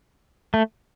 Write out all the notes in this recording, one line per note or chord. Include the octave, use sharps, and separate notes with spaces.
A3